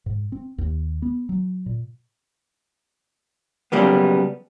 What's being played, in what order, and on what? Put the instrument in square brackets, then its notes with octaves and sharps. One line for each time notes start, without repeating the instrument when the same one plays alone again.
[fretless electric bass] G#2
C4
D#2
B3
F#3
A#2
[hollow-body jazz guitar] C#3 F#3 G3 A#3 B3